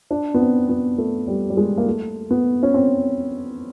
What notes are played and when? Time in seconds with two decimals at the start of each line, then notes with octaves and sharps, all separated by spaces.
0.11 D4
0.34 B3
0.40 C4
0.69 B3
0.98 A3
1.28 G3
1.50 G3
1.57 G#3
1.78 A#3
1.87 A3
2.31 B3
2.63 C#4
2.74 C4